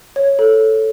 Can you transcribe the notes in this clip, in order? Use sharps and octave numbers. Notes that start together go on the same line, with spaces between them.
C#5
A4